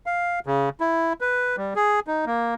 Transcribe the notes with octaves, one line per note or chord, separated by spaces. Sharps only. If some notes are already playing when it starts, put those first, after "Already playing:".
F5
C#3
E4
B4
G3
G#4
D#4
A#3